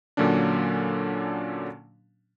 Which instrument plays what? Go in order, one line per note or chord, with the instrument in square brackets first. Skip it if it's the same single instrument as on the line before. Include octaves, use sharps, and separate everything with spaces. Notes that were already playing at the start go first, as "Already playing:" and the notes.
[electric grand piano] A#2 D3 F#3 A#3 C#4 D4